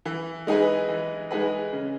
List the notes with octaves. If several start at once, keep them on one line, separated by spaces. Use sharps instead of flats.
E3
G#3 D#4 G#4 B4
E3
G#3 D#4 G#4 B4
C#3